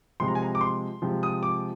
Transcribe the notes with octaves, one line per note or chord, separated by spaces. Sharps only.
C3 F3 G#3 C6
A#5
G#5
A#5
D6
C6
C3 F3 G#3
D#6
D6